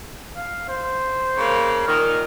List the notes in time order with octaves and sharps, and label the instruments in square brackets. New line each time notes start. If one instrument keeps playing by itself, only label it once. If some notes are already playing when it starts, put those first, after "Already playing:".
[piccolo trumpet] F5
C5
[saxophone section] C#3 A#3
[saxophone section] A#2 D#3 [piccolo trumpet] F6